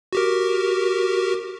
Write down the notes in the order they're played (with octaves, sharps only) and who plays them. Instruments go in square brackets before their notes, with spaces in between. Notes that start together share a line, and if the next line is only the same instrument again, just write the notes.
[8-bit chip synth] F#4 G4 A#4